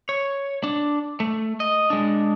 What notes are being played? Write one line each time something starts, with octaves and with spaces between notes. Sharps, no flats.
C#5
D4
A3
D#5
G#3 D4